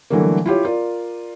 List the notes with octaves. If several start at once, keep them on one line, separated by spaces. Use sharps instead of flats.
D3 E3 F#3 G3 A3 A#3
E4 F4 G4 C#5
F4 A#4 D5